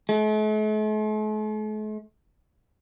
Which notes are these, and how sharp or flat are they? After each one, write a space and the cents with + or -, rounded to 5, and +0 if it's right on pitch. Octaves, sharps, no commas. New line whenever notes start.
A3 -45